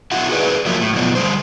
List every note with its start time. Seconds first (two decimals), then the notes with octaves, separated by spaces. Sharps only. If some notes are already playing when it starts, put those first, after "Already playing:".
0.11 F#3 E4 F#4 E5 F#5
0.30 F#4 G#4 B4 D5
0.66 F3 F#3 A#3 E4 F4
0.81 A2
0.93 F#2 B2 F3 D4
1.15 D3 G3 C5